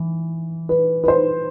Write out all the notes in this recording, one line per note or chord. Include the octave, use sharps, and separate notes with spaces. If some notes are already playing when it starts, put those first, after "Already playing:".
Already playing: E3
B4
B4
C5